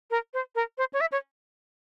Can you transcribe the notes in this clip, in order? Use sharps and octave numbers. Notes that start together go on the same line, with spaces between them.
A#4
C5
A#4
C5
C#5
E5
C#5